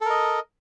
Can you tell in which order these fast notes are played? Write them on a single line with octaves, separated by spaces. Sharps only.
A4 A#4 D#5